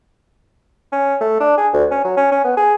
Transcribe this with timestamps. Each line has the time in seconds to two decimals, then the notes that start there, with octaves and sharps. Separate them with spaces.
0.92 C#4
1.21 A3
1.40 D4
1.58 G#4
1.73 D2
1.91 C#4
2.04 F#3
2.17 C#4
2.32 C#4
2.44 B3
2.57 G#4